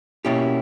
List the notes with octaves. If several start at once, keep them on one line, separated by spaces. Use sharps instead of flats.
B2 A#3 C#4 E4 G4